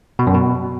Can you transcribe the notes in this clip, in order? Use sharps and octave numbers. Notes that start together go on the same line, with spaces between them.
B2
F#2
B2